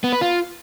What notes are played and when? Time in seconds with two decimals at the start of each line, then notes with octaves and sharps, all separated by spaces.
0.04 B3
0.13 B4
0.21 F4